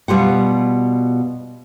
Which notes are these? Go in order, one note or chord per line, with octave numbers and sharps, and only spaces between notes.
B2 G3 F4 F#5